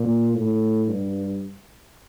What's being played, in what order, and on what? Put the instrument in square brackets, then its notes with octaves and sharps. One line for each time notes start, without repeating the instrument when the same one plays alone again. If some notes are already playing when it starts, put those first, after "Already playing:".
Already playing: [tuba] A#2
A2
G2